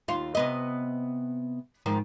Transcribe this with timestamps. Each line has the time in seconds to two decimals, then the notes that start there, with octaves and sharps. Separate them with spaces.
0.08 D#2 F4
0.35 C3 B3 D#5
1.86 G#2 D#3 F3